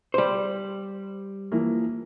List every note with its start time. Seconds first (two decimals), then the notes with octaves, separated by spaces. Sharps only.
0.14 G3 C5
1.52 E3 F3 A#3